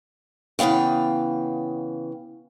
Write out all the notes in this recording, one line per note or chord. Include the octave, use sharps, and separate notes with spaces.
C#3 E3 B3 F5 G5